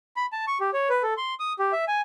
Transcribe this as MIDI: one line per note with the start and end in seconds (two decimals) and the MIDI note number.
0.16 0.26 83
0.32 0.45 81
0.48 0.58 85
0.60 0.70 67
0.73 0.89 73
0.89 1.03 71
1.03 1.14 69
1.17 1.34 84
1.40 1.53 87
1.59 1.72 67
1.72 1.85 76
1.88 2.01 80